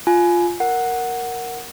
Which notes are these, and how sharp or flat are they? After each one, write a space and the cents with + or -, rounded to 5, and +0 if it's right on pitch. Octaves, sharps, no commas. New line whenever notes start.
F4 +0 G#5 +20
A#4 +0 F#5 +0